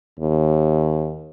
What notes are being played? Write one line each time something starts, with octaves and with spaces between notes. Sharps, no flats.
D#2